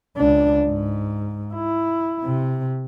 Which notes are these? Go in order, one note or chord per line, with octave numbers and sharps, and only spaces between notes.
C#2 D4
G#2
E4
C3